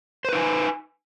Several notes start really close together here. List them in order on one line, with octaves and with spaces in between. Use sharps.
C5 B4 D#4 G#5